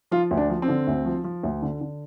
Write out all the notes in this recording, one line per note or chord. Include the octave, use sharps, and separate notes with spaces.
F3 F4
D2
D4
F3
C4
D3
D2
F3
F3
D2
D3
D3